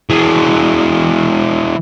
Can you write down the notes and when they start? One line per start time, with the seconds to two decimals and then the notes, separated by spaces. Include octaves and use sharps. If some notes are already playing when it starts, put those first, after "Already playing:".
0.10 E3 G#3